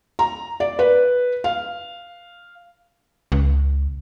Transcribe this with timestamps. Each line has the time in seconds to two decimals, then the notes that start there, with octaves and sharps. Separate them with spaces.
0.19 A#5
0.60 D5
0.79 B4
1.44 F5
3.32 C#2